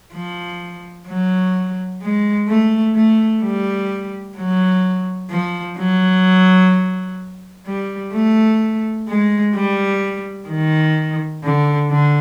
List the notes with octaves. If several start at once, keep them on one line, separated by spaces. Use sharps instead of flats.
F3
F#3
G#3
A3
A3
G3
F#3
F3
F#3
G3
A3
G#3
G3
D#3
D3
D3